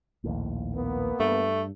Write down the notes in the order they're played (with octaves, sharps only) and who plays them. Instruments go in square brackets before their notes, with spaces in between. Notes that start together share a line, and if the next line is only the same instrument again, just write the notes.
[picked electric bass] A#1 D#2 A2
[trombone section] A#3 B3
[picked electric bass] G2 [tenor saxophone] A3